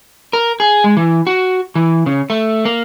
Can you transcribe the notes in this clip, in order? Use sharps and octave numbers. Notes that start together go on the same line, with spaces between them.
A#4
G#4
G#3
E3
F#4
E3
C#3
A3
A#3